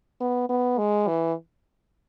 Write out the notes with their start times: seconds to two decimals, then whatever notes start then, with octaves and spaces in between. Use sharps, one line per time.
0.21 B3
0.49 B3
0.78 G#3
1.07 E3